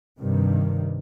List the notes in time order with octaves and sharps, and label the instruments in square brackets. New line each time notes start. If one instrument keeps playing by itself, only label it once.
[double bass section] G2 C3 D#3